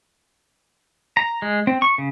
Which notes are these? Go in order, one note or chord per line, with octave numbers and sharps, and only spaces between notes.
A#5
G#3
C4
C#6
C#3